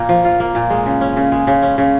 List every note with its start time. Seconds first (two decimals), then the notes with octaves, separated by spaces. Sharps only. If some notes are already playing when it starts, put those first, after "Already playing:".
Already playing: A#2 A#3
0.09 F3
0.25 F4
0.40 A#3
0.55 A#2
0.70 G#3
0.86 C#3
1.01 C#4
1.17 C#3
1.32 G#3
1.47 C#3
1.62 C#4
1.78 C#3